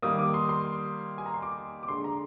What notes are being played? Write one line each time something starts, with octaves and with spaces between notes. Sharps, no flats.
D#3 G3 A#3 D#6
D6
C6
C6
G#5
A#5
C6
D6
D6
D3 G#3 C6
A#5